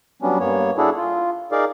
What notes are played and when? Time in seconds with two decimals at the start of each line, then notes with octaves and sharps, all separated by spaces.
0.22 F#3 G3 B3 C#4 D4
0.40 G2 A#3 B3 C#5
0.78 D4 E4 F#4 G#4 A4
0.97 F4
1.52 D#4 G#4 A#4 D5 F5